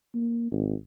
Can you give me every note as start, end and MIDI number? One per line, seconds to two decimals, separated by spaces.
0.14 0.47 58
0.52 0.74 32